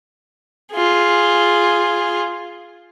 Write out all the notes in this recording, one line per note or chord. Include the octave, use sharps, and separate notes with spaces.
F4 G#4